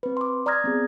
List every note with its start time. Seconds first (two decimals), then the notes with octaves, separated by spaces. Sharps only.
0.03 C4 B4
0.17 C6 D6
0.46 D5 A#5 D#6 F6 G#6 A#6
0.64 B3 C4 G#4